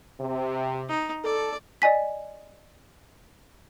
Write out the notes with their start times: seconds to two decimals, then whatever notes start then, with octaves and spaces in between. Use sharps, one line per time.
0.20 C3
0.88 D#4
1.24 A4 D5
1.82 D5 D#5 G#5 B6